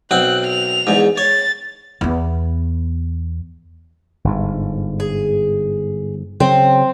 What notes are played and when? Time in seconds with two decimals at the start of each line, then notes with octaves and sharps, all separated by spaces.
0.11 B1 C4 F#5 F#6
0.47 F7
0.87 E2 G#2
1.18 C#5 A6
2.01 E2 B3
4.24 G1 G#2
5.00 G#4
6.40 C#3 F#3 C4